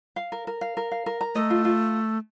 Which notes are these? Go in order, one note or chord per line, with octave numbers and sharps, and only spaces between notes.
F5
A#4
A#4
F5
A#4
F5
A#4
A#5
A3 D#5
F4
F4